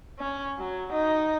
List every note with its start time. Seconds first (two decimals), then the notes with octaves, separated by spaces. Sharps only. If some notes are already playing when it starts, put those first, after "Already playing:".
0.19 C#4
0.59 F#3
0.92 D#4